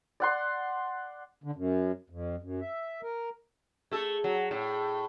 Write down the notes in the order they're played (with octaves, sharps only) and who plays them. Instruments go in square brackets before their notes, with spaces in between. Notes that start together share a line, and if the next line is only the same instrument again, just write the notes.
[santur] D5 F#5 C6
[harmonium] D3
F#2
F2
F#2
E5
A#4
[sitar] A3 A4 [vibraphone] G#4
[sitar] F#3
A2